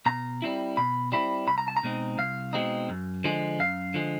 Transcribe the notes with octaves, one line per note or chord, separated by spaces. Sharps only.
B2 A#5
G3 C4 E4
B2 B5
G3 C4 E4 B5
C2 B5
A#5
A5
A#5
B2 G#3 C4 D#4
C2 F5
B2 G#3 C4 D#4
F#2
D3 F3 G#3
F#2 F5
D3 F3 G#3